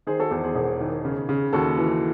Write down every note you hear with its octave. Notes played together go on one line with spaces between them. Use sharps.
D#3 G#4 C5
F#4 A4
E2 G#4 C5
G#4 C5
E1
D#3
C#3
C#3
D#2 F#4 A4
E3